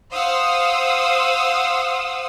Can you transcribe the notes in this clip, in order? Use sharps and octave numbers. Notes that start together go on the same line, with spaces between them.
C5 F5 F#5 D#6 E6